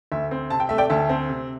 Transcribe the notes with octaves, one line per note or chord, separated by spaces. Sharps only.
D2 E5
C4
C3 A5
G5
A3 E5
D5 G5
D2 E5 A5
C4
C3